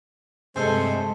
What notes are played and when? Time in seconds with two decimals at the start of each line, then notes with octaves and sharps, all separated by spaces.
0.56 G2 C3 G#3 A3 A4 C5 E5 G#5